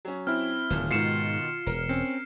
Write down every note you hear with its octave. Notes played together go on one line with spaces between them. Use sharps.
F#3 C#4
C4 E4 F6
D1 C2 A#2 D#3
G#2 B2 D#3 G#3 F4 C7 C#7 E7
E1 A#4
C4 C#4 C7